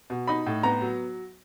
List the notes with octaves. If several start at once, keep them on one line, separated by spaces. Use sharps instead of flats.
B2
D#4 B5
A2
B3 A#5
F#3